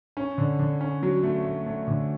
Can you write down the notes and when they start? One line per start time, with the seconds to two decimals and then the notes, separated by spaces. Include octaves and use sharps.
0.17 C#4
0.38 D3
0.59 D3
0.81 C#4
1.03 F#3
1.23 A3
1.45 A3
1.66 A3
1.88 D3